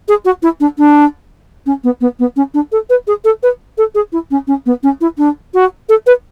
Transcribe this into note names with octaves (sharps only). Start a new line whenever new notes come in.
G#4
F#4
E4
D4
D4
C#4
B3
B3
B3
C#4
D4
A4
B4
G#4
A4
B4
A4
G#4
E4
C#4
C#4
B3
C#4
E4
D4
F#4
A4
B4